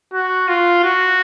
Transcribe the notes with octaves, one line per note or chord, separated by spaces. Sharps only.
F#4
F4
F#4